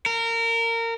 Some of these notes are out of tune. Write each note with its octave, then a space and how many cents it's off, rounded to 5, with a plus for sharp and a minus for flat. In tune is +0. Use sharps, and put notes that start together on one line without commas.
A#4 -25